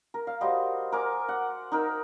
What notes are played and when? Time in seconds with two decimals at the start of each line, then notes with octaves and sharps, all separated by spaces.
0.14 A#4
0.27 F5
0.41 G3 F#4 C5 D#5
0.92 A#4 G#5 D6
1.29 F#5
1.72 D#4 A#4 E6